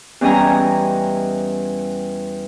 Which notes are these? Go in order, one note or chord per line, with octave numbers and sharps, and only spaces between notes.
E2 G3 C#4 D#5 G#5 A#5